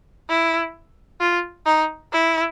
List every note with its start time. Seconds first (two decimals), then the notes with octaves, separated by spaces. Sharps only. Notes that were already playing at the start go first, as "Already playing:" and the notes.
0.29 E4
1.21 F4
1.66 D#4
2.12 E4